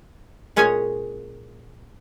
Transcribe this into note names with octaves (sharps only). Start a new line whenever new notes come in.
A#2 G#3 C#4 G#4 C#5 G#5